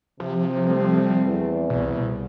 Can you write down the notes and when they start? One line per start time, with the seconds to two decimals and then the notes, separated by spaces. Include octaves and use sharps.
0.20 C3 F3
0.63 G3 A3 C4
1.25 E2
1.70 C2 B2